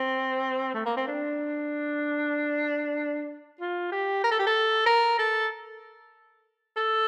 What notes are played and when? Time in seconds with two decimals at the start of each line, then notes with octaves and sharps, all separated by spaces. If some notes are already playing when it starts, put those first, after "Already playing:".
Already playing: C4
0.74 A3
0.86 A#3
0.97 C4
1.08 D4
3.61 F4
3.92 G4
4.24 A#4
4.31 A4
4.39 G4
4.47 A4
4.86 A#4
5.19 A4
6.77 A4